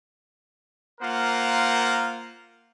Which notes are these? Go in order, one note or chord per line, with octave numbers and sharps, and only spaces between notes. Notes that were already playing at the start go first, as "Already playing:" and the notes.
A#3 F4 A#4 C5 F#5